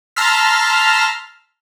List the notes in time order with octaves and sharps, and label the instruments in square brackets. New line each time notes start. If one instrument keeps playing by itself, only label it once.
[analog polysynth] A5 A#5 C6 E6 F6 B6